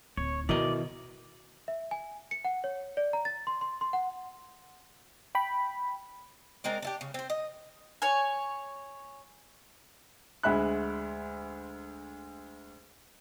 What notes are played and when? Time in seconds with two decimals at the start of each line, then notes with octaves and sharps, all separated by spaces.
0.17 D1 C#5
0.49 B2 D#3 E3 E4 A#4 D5 D#5
1.68 E5
1.91 G#5
2.31 C#7
2.45 F#5
2.64 C#5
2.97 D5
3.13 A#5
3.25 A6
3.47 C6
3.61 C6
3.81 C6
3.93 F#5
5.35 G5 B5
6.64 G#3 C4 A#4 D5
6.82 D4 E4 G4
7.01 C#3
7.14 C4 C5
7.30 D#5
8.02 C#5 G#5
10.43 D2 G#3 E5 B5 F#6